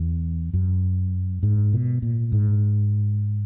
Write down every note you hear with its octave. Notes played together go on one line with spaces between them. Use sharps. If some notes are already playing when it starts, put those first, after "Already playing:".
Already playing: E2
F#2
G#2
B2
A#2
G#2